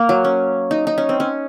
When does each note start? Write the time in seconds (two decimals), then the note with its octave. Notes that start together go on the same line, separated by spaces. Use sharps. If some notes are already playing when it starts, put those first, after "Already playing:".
Already playing: A#3
0.09 F#3
0.24 C#4
0.71 D#4
0.87 D#4
0.98 C#4
1.09 C4
1.20 C#4